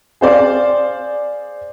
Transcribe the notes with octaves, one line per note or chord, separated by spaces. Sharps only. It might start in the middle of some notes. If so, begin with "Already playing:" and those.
G#4 C5 D5 F5